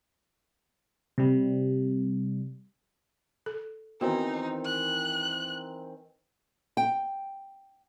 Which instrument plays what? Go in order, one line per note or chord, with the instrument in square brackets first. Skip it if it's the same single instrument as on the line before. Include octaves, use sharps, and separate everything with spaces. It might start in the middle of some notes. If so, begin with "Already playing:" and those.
[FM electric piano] C3 G3
[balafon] A4
[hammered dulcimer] D#3 E3 C4 [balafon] B3 F#4 [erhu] D#4
[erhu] F#6
[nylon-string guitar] G5